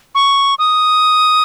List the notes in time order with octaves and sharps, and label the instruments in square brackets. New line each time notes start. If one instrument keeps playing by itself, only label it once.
[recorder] C#6
D#6